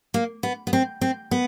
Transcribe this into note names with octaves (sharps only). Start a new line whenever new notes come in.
A#3
B3
B3
C4
C4
B3